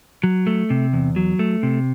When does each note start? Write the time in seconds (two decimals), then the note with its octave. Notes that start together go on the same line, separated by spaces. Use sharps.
0.24 F#3
0.47 A3
0.70 C3
0.93 E2
1.16 F#3
1.39 A3
1.63 C3